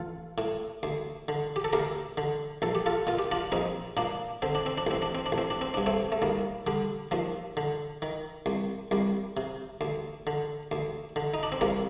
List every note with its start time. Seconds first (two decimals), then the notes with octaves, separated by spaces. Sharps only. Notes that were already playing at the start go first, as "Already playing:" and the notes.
Already playing: A1 F4 A4
0.38 A2
0.83 D2
1.28 D3
1.56 G4
1.64 A4
1.73 D2 G4 A#4
2.17 D3
2.62 A#1 A4
2.75 G4
2.86 F4 A4
3.07 A#2 F4
3.19 G4
3.32 D4 F4
3.52 A#1 C4 D#4
3.97 A#2 A#3 D4
4.42 D3 C4
4.55 D4
4.66 C4
4.78 D4
4.87 A1 C4
5.02 D4
5.15 C4
5.26 D4
5.32 A1
5.38 C4
5.50 D4
5.61 C4
5.74 G2 D4
5.86 A3 C4
6.12 A3
6.22 D#2 G3 A#3
6.67 D3 G3
7.11 D#2 F3
7.57 D3
8.02 D#3
8.46 C2
8.91 C2 G3
9.37 C3
9.81 D2
10.27 D3
10.72 D2
11.16 D3
11.34 D#4
11.43 D4
11.52 C4
11.61 C2 G3 A#3